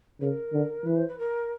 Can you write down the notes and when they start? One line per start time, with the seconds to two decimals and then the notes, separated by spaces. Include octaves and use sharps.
0.20 C#3 A#4 B4
0.53 D3
0.85 E3 B4
0.96 C5
1.08 B4
1.18 A#4